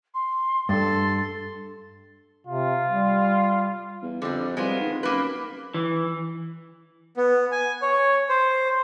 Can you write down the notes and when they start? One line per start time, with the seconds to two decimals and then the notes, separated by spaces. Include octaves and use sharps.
0.14 C6
0.69 G2 A4 C6 A6
2.47 C3 F4
2.86 G3
4.02 E2
4.22 F2 D3 G3
4.57 C2 G#3 B3 F4
4.81 D#3
5.03 F#2 A#3 B4
5.74 E3
7.17 B3
7.52 G#5
7.82 C#5
8.29 C5